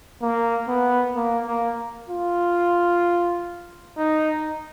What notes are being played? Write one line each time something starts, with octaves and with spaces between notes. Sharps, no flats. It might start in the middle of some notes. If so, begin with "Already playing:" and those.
A#3
B3
A#3
A#3
F4
D#4